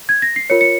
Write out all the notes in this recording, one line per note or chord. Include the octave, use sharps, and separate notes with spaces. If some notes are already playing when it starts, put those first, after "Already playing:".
G#6
A#6
C7
F4 A#4 C#5 C#7
C#7